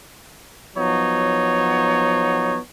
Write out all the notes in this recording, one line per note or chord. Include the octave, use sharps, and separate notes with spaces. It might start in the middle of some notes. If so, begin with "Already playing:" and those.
F3 F#3 B3 D#4 C#5